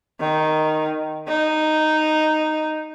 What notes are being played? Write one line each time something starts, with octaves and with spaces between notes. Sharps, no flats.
D#3
D#4